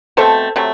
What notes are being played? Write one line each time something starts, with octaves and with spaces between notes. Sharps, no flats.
B2 A3 C4 A4 C5
C3 F#3 A3